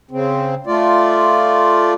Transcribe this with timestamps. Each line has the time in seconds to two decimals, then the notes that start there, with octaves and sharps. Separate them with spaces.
0.11 C#3 C4
0.67 A3 F4 D5